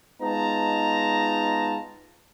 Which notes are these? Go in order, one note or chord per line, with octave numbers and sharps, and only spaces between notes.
G#3 B3 D#4 F4 A5 A#5